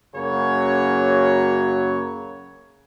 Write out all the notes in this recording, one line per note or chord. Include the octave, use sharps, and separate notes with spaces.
F#2 C#3 F#3 A#3 C#5